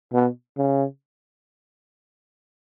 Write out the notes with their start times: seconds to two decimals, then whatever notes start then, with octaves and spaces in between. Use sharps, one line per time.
0.13 B2
0.57 C#3